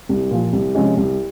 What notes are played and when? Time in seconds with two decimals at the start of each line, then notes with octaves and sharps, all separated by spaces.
0.09 C2
0.31 A#2 F3
0.53 C2
0.75 C3 F3 G#3 C#4
0.97 C2